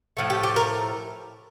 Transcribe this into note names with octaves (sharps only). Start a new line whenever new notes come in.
A2 F3 A3
G4
G4
A#4